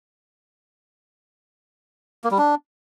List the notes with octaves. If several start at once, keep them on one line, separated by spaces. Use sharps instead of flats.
A#3
G3
D4